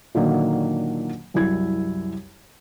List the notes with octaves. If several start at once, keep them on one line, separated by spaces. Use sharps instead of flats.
A#2 D3 D#3 F#3 A#3
C2 F#2 E4 G#6